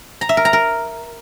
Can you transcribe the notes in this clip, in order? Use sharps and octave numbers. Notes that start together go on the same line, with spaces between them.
A#5
E5
A#4
A#5
A#4